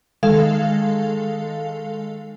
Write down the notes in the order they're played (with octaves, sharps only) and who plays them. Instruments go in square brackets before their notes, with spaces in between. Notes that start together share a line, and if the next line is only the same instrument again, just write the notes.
[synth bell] D#3 G#3 A4 F5